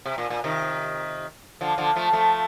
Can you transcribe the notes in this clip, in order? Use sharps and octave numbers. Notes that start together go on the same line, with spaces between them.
C3
A#2
A#2
C3 D#3
D3 F3
D3 F3
F3 A3
F3 A3